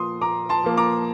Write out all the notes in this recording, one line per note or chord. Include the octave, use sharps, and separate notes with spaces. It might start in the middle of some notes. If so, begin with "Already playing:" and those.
Already playing: A#2 F3 A#3 C6 D#6
A#2 A#5 D6
A5 C6
F3 A#3
A#5 D6